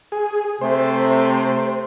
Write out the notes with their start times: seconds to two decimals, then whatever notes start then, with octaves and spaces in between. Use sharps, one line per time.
0.12 G#4
0.61 C3 A3 C5